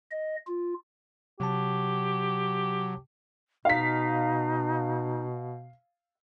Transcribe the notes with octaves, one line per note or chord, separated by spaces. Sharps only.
D#5
F4
C3 F#3 G4 A5
B2 D#4 F5 B6